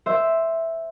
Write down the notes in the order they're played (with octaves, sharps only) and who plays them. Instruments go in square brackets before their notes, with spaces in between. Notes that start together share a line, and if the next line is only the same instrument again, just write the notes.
[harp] C5 E5